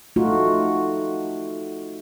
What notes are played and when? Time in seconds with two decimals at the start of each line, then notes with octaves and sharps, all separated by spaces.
0.16 A3 D#4 F4 F#4